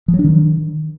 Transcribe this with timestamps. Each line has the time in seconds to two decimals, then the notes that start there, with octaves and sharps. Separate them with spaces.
0.08 F3
0.14 F#3
0.19 D4
0.24 D#3